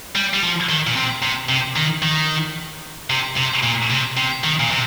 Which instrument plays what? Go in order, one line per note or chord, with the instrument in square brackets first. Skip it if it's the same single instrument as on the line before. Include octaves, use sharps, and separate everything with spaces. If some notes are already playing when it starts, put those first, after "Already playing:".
[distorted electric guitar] G3
G3
F3
D#3
A#2
C3
C3
C3
D#3
D#3
C3
C3
A#2
C3
C3
D#3
A#2
C3